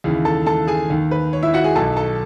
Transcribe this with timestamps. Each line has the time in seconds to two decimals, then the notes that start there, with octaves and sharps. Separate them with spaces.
0.04 D#2 C#3 E3
0.25 A4 A5
0.46 A4 A5
0.67 G#4 G#5
0.90 D#2 D#3
1.11 B4
1.33 C#5
1.43 E4 E5
1.54 F#4 F#5
1.64 G#4 G#5
1.75 B1 B2 A4 A5
1.97 A4 A5